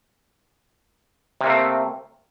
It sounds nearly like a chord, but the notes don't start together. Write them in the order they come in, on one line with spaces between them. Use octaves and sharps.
C3 A#3 A3 C4